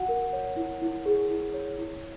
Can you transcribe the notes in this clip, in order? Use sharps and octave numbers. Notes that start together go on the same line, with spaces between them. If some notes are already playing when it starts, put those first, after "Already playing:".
Already playing: F#4 F#5
A#4
C#5
E4
E4
G#4
E4
C#5
E4